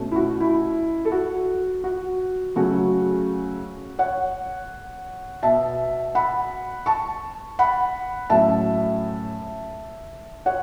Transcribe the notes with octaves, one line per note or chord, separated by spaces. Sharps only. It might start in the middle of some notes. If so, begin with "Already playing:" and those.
Already playing: B2 A3 C#4
E4
F#4
E4
A4
F#4
F#4
C#3 F#3 A3 C#4 F#4
C#5 F#5
B2 B3 E5 A5
F#5 B5
A5 C#6
F#5 B5
A2 F#3 A3 C#4 E5 A5
C#5 F#5